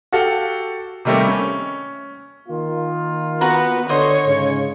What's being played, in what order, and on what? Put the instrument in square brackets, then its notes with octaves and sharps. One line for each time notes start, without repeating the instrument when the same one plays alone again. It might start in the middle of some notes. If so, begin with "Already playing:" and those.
[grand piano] F#4 G4 A4 F5
C3 D#3 G3 A3 A#3 C4
C#4
[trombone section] D#3 A#3 F4
[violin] B3 [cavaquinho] F#4 B4 A#5
[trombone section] D3 [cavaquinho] C5 D#5 C6 [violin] C#5
[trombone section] G#2 C#3